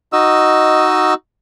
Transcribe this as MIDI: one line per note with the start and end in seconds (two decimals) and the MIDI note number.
0.13 1.14 63
0.13 1.14 66
0.13 1.14 75
0.13 1.14 88